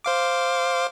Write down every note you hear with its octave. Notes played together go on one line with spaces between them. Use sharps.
C5 F5 D6